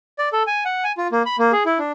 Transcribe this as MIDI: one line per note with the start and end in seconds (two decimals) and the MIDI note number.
0.19 0.29 74
0.33 0.43 69
0.47 0.64 80
0.65 0.84 78
0.84 0.92 80
0.97 1.07 65
1.12 1.23 58
1.26 1.36 83
1.38 1.52 58
1.52 1.63 68
1.66 1.78 64
1.79 1.92 62